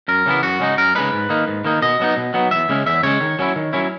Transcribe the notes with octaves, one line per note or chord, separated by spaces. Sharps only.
F#2 A#4
C#3 E3 B3 E4
F#2 F#4
C#3 G#3 D#4
F#2 A#4
C#3 G#3 D#4 B4
G#2
D#3 A#3 D#4
G#2
D#3 A#3 D#4
B2 D#5
F#3 B3 D#4
B2
F#3 B3 D#4
E2 E5
C#3 G#3 C#4
E2 E5
C#3 G#3 C#4 C#5
D#3
F#3 C#4 E4
D#3
F#3 C#4 E4